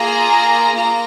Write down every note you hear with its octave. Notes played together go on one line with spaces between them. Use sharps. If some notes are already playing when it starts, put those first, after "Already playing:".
Already playing: A#3 F4 G#4 A#5
A#3 F4 A#5